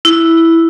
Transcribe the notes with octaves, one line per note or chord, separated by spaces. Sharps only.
E4